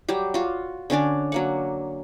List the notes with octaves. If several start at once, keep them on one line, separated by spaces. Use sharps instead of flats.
F#3 G3 G4
F4 F#4
D3 C#4 D4 D5
F#3 A#3 F#5